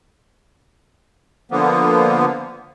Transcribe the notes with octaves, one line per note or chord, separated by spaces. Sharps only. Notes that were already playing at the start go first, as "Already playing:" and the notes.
D3 F3 A#3 B3